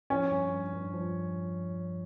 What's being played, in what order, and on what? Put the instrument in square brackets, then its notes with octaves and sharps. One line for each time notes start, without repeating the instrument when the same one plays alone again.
[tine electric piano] F3 [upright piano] C#4
[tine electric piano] G2
G2
G2
F3